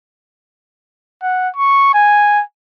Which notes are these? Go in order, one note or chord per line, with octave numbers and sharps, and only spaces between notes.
F#5
C#6
G#5